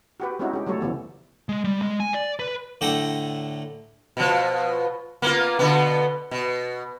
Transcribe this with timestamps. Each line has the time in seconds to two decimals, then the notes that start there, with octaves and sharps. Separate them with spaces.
0.20 F#4 G4 B4
0.39 G#3 C4 C#4 D#4 E4 F#4
0.53 G#3 G4
0.67 F#3 G3 A3 A4 C#5
0.81 C#3 E3 F3 B3
1.49 G#3
1.64 G3
1.82 G#3
2.00 G#5
2.14 D5
2.39 B4
2.81 A2 D3 A4 G5 A#5 D#6
4.17 B2 F3
5.22 A#3 B3 F4
5.59 B2 D3 B3
6.31 B2